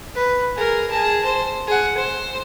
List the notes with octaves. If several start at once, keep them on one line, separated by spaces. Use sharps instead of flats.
B4
G#4 A#4
G#4 A5
C5
G#4 F#5
C5